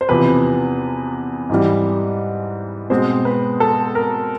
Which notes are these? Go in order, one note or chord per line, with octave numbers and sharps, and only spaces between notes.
C5
E2 C3 F3 B4
G#2 E3 G3
B2 G#3 C4 C5
B4
A4
A#4